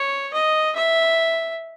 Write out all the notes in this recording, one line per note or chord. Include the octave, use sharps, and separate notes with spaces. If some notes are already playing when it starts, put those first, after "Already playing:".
Already playing: C#5
D#5
E5